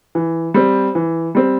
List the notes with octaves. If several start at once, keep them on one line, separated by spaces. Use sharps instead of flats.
E3
G3 C4
E3
G3 C4